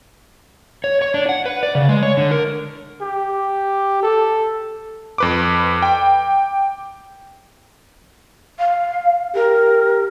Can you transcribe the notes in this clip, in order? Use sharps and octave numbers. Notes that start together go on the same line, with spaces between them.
C#5
C#5
D4
F#5
B4
D5
C#3
G#3
C#5
D3
A#4
G4
A4
F2 B4 D6
G5
F5
G4 A#4